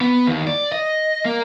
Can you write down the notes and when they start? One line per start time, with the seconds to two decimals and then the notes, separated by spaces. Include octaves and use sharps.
0.01 B3
0.27 D#2
0.47 D5
0.72 D#5
1.25 A#3